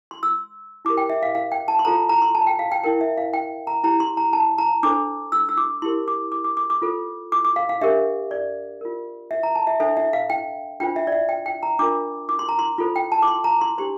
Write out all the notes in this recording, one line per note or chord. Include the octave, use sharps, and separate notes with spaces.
C6
E6
E4 G4 A#4 D6
G5
E5
F5
F5
G5
A5
C6
F4 A4 C5 A#5
A#5
C6
A5
G5
F5
G5
E4 A#4 G5
E5
F5
G5
A#5
E4 G4 C5 A#5
C6
A#5
A5
A#5
D4 A4 C5 D6
E6
E6
D6
E4 G4 A#4 C6
D6
D6
D6
D6
D6
F4 A4 C5
D6
D6
F5
F5
D4 G4 A#4 E5
D5
F4 A#4
E5
A#5
A5
E5
D4 A4 C5 E5
E5
F5
G5
D4 F4 C5 G5
E5
D5
E5
G5
G5
A#5
D4 F4 A#4 D6
D6
C6
A#5
C6
F4 A4 C5
G5
A5
D6
C6
A#5
C6
D4 G4 C5 C6